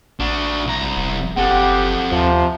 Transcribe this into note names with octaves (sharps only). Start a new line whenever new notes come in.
A1 D4 F#4
C2 A#5
D#1
F#1 C4 G4 A4 F#5
D#2 C3 F3